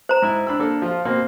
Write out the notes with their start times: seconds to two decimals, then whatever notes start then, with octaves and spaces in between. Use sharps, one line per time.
0.09 C5 A#5
0.22 G#2 E4
0.47 D4 B5 E6
0.59 A#3 D4 A4
0.82 F3 F4
1.05 B2 A#3 C4